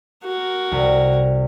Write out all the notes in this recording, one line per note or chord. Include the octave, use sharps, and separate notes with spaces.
F#4 A#4
C2